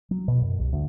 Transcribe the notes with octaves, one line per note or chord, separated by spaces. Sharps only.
F#3
B2
F#2
C2
D2